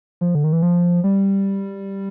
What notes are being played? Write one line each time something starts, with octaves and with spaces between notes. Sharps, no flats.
F3
D3
D#3
E3
F3
G3